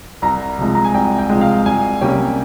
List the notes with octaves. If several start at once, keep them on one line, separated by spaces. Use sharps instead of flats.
C2 A#5
C3 F3 G#3
A#5
G#5
C2 G5
G5
C3 F3 G#3
F5
C2 G#5
C3 G3 A#3 C#4 G5